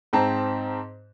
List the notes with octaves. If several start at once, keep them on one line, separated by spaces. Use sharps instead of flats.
G#2 C4 A5 A#5